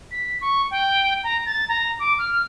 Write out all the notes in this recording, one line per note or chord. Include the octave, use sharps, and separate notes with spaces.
B6
C#6
G5
A#5
A6
A#5
D6
F6